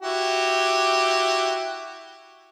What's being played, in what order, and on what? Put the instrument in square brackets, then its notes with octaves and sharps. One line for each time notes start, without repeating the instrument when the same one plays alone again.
[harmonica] E4 F#4 G4